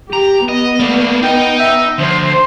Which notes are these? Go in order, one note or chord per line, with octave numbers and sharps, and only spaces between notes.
G4 A#5
B3 D#5
A3 A#3 D5
D#4 D#5 G5
E5
D2 F3 C5